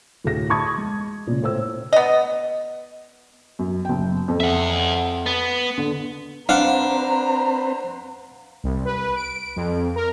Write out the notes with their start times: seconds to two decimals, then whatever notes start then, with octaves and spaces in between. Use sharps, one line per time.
0.24 D2 A2 G#4 A#6
0.50 A5 B5 C#6 D#6 G#6
0.77 G#3
1.27 A#2 C#3
1.42 A2 C5 E6
1.93 B3 D#5
3.59 F#2
3.85 F#1 G5
4.28 F2
4.40 E5 F#5
5.26 B3
5.78 D3
6.49 C4 D4 B4 C5 F5 F#5 A#5
8.64 C2
8.85 B4
9.16 D7
9.56 F2
9.96 A#4